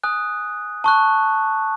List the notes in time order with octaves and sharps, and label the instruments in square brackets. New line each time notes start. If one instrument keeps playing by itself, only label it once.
[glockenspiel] G#5 D#6 F#6
A5 C#6 F#6